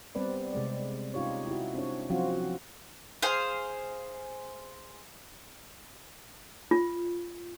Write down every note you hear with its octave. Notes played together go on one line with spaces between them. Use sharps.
G3 B3 C4 B4 D5
C3 G#3 D5
C#4 D#4 F4 G4 C#5
E4 F#4
C4 D4 C#5
F3 F#3 C4 C#4 F4 F#4
G#4 C5 F5
F4